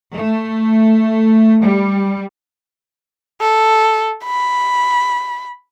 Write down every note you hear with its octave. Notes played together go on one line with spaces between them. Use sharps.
A3
G3
A4
B5